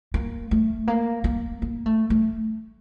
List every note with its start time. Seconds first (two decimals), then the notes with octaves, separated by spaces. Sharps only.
0.14 A#3
0.51 A3
0.88 A#3
1.24 A#3
1.62 A#3
1.86 A3
2.10 A3